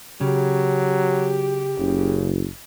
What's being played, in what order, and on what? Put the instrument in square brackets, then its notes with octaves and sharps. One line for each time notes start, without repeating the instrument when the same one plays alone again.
[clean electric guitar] C#3 [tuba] F#3 [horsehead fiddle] G4
[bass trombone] F#1 [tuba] C#3